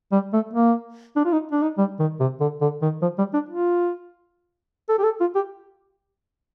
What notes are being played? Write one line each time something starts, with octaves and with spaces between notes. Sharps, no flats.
G3
A3
A#3
D4
F4
D#4
D4
D#4
G3
D#3
C3
D3
D3
D#3
F3
G3
D4
F4
A4
G4
A4
F4
G4